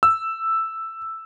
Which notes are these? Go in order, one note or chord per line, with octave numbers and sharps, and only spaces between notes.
E6